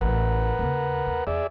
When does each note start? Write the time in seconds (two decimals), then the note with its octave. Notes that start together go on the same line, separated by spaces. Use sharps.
0.01 A1 A3 A#4 B4 F#5
0.59 D#2 C#3
1.07 D#2
1.27 E2 G#4 D5 E5